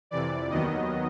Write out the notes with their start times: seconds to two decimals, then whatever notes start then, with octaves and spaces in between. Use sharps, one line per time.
0.11 F2 C3 E3 D5
0.50 D#2 D#3 F#3 B3 D#5